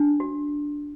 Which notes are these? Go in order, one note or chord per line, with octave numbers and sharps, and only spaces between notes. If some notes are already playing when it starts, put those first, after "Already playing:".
Already playing: D4
F#4